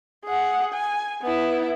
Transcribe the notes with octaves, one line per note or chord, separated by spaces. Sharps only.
G#4 F#5
G#5
B3 E4